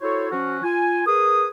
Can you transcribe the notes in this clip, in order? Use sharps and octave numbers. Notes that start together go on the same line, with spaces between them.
E4 F#4 A4 C5 C#5
F3 C#4 F#4
F4 G#5
G#4 A#4 B4 D#6